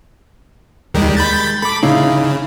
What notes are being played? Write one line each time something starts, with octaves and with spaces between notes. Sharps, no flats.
D#2 D#3 G3 G#3
B5 G6 A6
A4 B5 D6
C#3 D#4 E4 F5